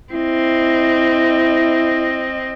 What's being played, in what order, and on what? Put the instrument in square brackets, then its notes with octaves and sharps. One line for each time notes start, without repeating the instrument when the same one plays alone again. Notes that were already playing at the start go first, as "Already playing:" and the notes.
[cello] C4 D#5 [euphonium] E4